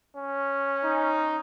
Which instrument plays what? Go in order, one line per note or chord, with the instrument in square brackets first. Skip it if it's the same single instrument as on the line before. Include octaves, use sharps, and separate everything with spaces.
[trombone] C#4
[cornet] D#4